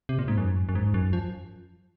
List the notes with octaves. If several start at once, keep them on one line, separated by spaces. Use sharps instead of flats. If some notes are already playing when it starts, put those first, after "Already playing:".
C3
A#2
G#2
F#2
F#2
G#2
F#2
F3